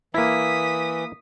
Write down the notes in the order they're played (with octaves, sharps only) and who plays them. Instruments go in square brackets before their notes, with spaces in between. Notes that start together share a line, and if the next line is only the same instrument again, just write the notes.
[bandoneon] E3 [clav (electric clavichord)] A#3 E4 [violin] D#6 B6